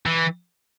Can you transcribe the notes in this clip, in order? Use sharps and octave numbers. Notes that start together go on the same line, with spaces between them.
E3